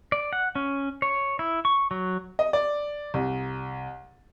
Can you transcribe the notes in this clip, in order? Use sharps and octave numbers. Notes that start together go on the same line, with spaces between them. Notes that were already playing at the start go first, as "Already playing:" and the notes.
D5
F#5
C#4
C#5
E4
C#6
F#3
D#5
D5
C2